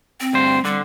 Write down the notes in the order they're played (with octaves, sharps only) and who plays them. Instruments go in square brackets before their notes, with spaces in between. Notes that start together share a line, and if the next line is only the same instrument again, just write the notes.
[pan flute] C4
[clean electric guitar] D2 G2 C5
[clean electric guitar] D3 [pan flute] G3